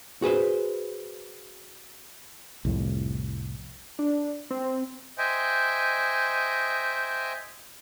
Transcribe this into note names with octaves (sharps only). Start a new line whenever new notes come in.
F#4 G#4 B4 C5
C2 F2 A2
D4
C4
C5 D#5 E5 G5 G#5